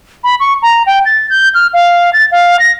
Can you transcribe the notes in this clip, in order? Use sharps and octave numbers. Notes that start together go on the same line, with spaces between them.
B5
C#6
A#5
G5
A6
G6
F6
F5
A6
F5
A#6